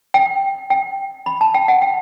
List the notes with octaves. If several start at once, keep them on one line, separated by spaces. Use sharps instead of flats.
G5
G5
B5
A5
G5
F#5
G5